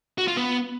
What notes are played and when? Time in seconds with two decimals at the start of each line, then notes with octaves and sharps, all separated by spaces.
0.18 F#4
0.28 F4
0.37 B3